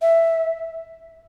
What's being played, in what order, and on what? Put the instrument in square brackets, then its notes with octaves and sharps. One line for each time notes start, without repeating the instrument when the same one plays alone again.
[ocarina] E5